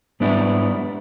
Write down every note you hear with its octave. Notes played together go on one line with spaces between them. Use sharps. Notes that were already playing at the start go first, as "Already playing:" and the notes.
G#2 G3 B3 D4 E4